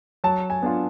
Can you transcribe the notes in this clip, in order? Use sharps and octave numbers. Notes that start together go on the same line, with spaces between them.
F#3 A5
G#5
B3 D4 F4